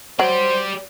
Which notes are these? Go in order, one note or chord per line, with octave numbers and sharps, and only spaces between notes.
F#3 G4 C5 D5